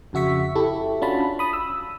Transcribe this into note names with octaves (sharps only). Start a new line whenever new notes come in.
F2 C#3 F#4 E5 C#6 B6
E4 G4 A4
C#4 D4 F4 F#4 A5 B5
B5 D#6
E6